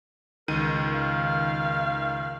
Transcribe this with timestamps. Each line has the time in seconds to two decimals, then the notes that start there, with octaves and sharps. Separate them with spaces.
0.48 C#2 D#3 A#4 D#7
0.94 F5